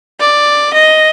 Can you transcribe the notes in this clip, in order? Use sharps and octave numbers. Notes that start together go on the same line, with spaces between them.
D5
D#5